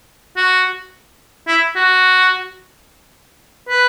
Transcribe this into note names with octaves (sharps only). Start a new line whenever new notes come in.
F#4
E4
F#4
B4